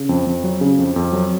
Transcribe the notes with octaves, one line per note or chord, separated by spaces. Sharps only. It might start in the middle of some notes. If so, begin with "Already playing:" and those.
Already playing: C#3
F2
F2
F#3
C#3
F2
F2
F#3